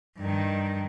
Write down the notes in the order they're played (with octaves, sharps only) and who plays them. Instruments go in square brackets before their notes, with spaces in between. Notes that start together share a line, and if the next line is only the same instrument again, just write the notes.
[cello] G2 D#3